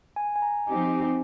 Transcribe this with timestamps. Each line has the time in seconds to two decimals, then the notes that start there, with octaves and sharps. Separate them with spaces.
0.16 G#5
0.36 G#5
0.42 A#5
0.67 F3 C4 D#4 G4 G#5